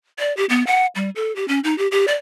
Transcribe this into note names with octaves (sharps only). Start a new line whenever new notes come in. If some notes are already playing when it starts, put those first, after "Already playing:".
D5
G4
B3
F#5
G3
A4
G4
C#4
D#4
G4
G4
D5